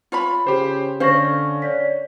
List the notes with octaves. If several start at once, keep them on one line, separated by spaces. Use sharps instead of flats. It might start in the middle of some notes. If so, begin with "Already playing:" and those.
F4 C#5 B5
C#3 G4 C5
D3 C#4 C5 F5 C#6 A#6
C#5 D5 B6